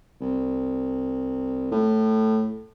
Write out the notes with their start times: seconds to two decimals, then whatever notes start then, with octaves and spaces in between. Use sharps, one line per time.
0.21 C2
1.71 A2